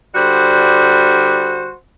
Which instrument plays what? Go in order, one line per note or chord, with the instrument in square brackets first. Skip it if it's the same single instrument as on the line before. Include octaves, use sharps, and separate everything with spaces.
[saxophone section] D3 G3 F#4 C5